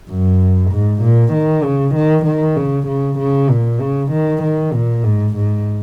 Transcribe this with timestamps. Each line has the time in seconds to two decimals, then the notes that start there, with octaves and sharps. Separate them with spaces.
0.09 F#2
0.71 G#2
1.02 A#2
1.33 D#3
1.64 C#3
1.95 D#3
2.26 D#3
2.57 C#3
2.87 C#3
3.19 C#3
3.50 A#2
3.81 C#3
4.12 D#3
4.43 D#3
4.74 A#2
5.04 G#2
5.36 G#2